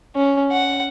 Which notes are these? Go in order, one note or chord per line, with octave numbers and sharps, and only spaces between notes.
C#4
F#5